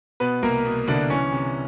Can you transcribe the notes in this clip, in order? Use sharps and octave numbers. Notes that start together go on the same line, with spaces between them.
B2 B3 B4
C2 A#3 A#4
B2
C2 D3 D4
E3 C#4
C3